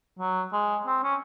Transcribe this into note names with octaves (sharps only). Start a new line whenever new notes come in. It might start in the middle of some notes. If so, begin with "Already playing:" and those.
F#3
G#3
C4
C#4